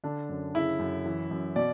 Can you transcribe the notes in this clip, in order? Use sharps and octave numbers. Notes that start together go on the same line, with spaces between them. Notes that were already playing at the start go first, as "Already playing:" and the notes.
D3 D4
F#2
C#3 E4
F#2
E3
F#2
B2 D5